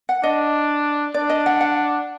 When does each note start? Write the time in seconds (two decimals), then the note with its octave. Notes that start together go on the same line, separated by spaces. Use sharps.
0.09 F#5
0.23 D4 D#5
1.14 D4 D5
1.30 D#5
1.46 F#5
1.61 F#5